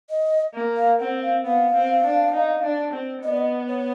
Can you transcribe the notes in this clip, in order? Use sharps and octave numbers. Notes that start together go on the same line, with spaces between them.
D#5
A#3
F5
C4 F#5
F5
B3 F5
C4
D4
D#4
D4
C4
B3 D#5
D5
D#5
C#5